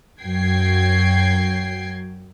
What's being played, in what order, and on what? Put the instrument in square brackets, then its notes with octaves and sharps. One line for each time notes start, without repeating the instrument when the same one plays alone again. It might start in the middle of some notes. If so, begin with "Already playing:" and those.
[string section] F#2 F#3 G5 G#6 C7